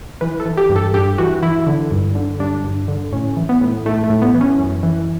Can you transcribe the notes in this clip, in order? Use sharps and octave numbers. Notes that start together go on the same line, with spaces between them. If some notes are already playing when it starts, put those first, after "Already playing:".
E3 B4
A4
E3
G4
G2
A4
G2 G4
E3 F#4
E3 E4
D3
G2
D3
G2 D4
G2
D3
A2 C#4
E3
B3
A2
A2 A3
A3
A2
B3
E3
C#4
F#2
E3